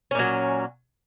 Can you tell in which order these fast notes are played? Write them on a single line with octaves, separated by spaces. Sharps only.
C#4 A#2 F#3